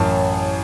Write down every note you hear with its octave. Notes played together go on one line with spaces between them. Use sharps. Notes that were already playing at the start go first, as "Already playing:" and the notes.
Already playing: A1 F#2 A5